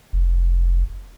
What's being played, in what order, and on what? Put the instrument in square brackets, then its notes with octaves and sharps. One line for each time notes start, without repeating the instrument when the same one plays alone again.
[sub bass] F1